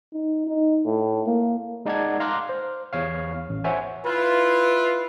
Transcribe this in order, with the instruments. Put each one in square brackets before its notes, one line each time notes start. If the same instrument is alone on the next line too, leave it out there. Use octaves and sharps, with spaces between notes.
[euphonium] D#4
D#4
A2
A#3
[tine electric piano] G#3 D#4 D5 F#5 A5 G#6
F5 A#5 C6 D6 F6 F#6
C5
E2 C#5 F5
A1
C5 C#5 E5 F#5 G#5
[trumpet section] E4 F4 [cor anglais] B4